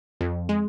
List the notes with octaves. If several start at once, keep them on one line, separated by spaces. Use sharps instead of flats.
F2
G#3